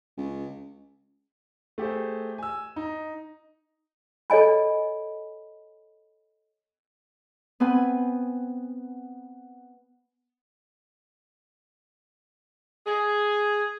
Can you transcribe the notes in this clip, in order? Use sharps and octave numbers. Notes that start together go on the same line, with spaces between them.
C#2
A3 G4 G#4 C5
G#5 E6
D#4
A4 C#5 D#5 G#5 B5
B3 C4 B4 G#5
G#4